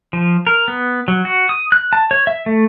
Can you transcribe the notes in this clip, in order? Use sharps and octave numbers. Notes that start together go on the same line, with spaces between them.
F3
A#4
B3
F#3
F#4
D#6
F#6
A5
C#5
E5
A3